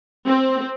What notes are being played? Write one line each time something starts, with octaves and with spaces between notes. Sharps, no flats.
C4